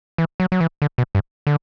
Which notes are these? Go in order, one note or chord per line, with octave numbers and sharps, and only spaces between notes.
E3
F#3
F#3
E3
D3
B2
G2
D3